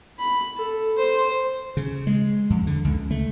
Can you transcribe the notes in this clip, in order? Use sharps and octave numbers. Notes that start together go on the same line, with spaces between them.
B5
A4
C5
C#3
G#3
F2
D3
C#2
A3